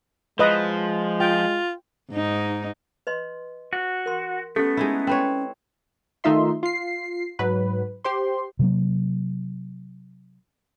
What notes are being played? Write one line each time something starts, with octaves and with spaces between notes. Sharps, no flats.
F3 G#3 B4 D#5
F4 G5
G#2 D#4
B4 D#5 C6
F#4
A#4 C6
A3 B3 C#4 G4 A4
G#3 D#4 E4
C4 B4 C#5
D#3 A3 D#4 F4 E5 C6
F4 C7
G#2 F#3 B4
G4 C5 C6
C3 F#3 A#3